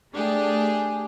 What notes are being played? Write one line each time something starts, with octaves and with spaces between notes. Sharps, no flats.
A3 D4 G4 G#4